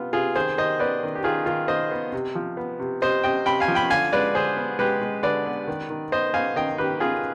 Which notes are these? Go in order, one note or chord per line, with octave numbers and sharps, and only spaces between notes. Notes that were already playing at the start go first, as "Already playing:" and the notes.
Already playing: C3 B3 F4
C3 F4 G#4
D#3 G#4 C5
D#3 C5 D#5
B3 B4 D5
D#3
G4
D#3 F4 G#4
D#3 F4
D#3 C5 D#5
B3
C3
F3
B3
C3
C3 C5 D#5
C3 D#5 G5
C3 G5 B5
F5 G#5
F3
G5 B5
D3 F5 G#5
G#3 B4 D5
D3 G#4 C5
B3
G#3 G4 B4
G#3
D3 B4 D5
B3
D#3
D#3
B3 C5 D#5
B3 F5 G#5
D#3 D#5 G5
D#3 G4 B4
B3 F4 G#4